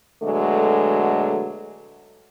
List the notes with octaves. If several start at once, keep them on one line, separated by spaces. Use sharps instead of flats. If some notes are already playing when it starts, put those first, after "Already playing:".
B2 D3 F#3 G#3 A3